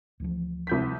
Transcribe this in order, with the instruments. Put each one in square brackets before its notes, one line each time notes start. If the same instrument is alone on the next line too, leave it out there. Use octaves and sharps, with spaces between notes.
[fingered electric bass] D2 E3 F3
[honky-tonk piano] C2 G6 B6